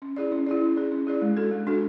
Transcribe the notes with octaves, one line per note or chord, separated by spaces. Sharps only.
C#4
E4 G#4 D5
C#4
E4 G#4 D5
C#4
E4 G#4 D5
C#4
E4 G#4 D5
G#3
D4 F#4 A4
G#3
D4 F#4 A4